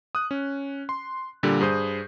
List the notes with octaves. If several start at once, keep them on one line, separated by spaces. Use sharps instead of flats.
D#6 F#6
C#4
C6
A#2 D3 G3
G2 G#4 C5 D#6 G6